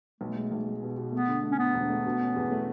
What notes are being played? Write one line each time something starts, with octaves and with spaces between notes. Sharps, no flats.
B1 A3
G#3
B1
G#3
B2
B2
A3 B3
D3
A3
C#4
D2 B3
E1
A3
B2
C#4
E2
A3